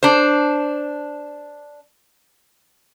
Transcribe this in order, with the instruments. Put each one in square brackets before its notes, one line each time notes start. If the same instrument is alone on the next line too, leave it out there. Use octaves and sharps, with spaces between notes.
[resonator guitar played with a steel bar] D4 C5